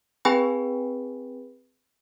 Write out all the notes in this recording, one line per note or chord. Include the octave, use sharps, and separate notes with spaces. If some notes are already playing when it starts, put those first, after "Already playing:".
C4 G#4 B4 G5 G#5 B5